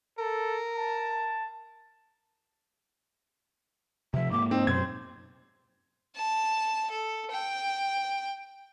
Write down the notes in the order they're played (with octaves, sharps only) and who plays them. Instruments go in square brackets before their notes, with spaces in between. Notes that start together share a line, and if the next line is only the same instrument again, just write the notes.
[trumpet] A4 [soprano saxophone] A#4
[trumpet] A5
[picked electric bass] C3 F3 [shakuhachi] E5
[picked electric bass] G#2 A#3 [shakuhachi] D6
[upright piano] C4 [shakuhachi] D#4
[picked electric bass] F#2 B2 F#3 [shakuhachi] C5 [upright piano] G#6
[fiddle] A5
A4
G5